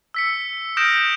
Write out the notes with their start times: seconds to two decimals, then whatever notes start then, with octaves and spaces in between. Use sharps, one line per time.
0.14 E6 B6 C#7
0.77 D#6 F6 G6 A#6 D7 E7